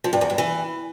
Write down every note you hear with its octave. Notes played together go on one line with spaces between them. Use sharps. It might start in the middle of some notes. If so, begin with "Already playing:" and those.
F3
G2
E2
G2
E3